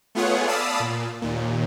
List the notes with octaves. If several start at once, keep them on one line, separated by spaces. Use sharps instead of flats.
A3 B3 F4 G#4 C#5 F#5
D5 F5 A5 B5 D#6 E6
A#2
D#2 A#2